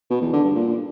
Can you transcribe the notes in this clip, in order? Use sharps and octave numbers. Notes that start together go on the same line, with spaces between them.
B2
E2
D3
G2
A#2